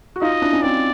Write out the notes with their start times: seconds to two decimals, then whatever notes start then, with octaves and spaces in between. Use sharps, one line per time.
0.16 F#4
0.22 D#4 F4 D#5
0.42 D4 E4
0.53 C#4 D#4
0.62 C4 D4 D5